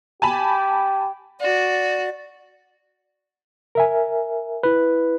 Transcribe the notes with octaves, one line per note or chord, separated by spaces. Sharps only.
G4 G#5 A5 B5
F#4 D5
A#4 E5 G#5
E4 B4